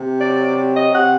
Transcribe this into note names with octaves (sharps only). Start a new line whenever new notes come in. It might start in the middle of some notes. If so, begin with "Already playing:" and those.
Already playing: C3
F#3 D5
C3
D#5
C3 F#5